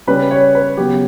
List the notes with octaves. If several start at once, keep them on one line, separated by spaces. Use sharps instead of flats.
C#3 G3 C#4 B4
C#5
B4
C#3 F#3 B3 G4